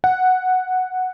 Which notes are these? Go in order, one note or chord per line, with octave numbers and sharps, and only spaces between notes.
F#5